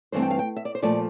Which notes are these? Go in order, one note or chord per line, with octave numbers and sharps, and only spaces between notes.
G2 E3 A3 C4 C5
G5
F5
G5
E5
D5
C5
A#2 F3 A3 D5